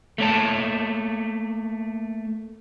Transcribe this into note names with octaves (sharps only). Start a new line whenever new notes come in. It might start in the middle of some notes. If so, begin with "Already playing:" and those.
A3 A#3 C#5 A5